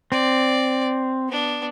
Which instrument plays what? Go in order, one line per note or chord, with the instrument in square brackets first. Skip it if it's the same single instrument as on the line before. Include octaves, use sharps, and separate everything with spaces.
[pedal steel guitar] C4 [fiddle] D5
[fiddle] B3 D4